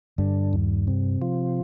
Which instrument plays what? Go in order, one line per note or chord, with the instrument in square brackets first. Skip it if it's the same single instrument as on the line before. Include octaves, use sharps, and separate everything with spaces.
[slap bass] G2 G3 [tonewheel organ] D3
[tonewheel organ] D#2
C3
F3